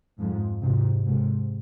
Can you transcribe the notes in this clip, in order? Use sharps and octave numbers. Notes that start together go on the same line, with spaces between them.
F2 G#2
G#2 C3
G#2 C3